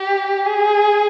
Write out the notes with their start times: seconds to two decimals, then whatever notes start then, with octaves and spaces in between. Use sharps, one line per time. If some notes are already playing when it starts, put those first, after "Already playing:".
Already playing: G4
0.46 G#4